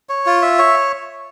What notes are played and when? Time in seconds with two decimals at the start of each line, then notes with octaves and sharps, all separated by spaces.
0.09 C#5
0.26 F4
0.42 E5
0.58 C#5